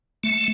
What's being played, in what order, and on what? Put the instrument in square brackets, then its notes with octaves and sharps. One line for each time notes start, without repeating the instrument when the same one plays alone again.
[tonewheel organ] A3